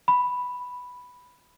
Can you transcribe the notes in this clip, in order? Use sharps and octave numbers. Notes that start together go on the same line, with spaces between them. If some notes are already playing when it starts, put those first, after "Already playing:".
B5